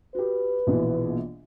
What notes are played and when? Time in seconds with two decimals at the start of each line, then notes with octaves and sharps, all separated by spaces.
0.15 F#4 G4 B4
0.67 A#1 B2 E3